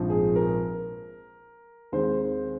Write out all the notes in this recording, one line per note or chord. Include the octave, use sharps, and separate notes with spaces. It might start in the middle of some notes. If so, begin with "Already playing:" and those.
Already playing: A#1 G#2 F3 C4
G#4
A#4
D#2 D#3 G#3 C4 C5